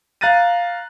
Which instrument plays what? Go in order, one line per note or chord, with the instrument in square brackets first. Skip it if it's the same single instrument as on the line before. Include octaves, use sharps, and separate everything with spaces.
[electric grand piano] F5 A#5 F#6 A6 A#6 D#7